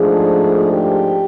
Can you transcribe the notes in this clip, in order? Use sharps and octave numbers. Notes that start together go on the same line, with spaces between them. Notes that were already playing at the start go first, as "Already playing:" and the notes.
Already playing: G#2 F3 A3 D4 G#4
G4